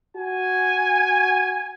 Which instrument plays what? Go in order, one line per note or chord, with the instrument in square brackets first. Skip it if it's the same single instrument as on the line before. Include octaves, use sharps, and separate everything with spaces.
[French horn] F#4 [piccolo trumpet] G#5